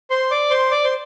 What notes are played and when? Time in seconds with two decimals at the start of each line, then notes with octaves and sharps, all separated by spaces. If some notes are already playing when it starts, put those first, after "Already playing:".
0.10 C5 C6
0.31 D5 D6
0.50 C5 C6
0.71 D5 D6
0.84 C5 C6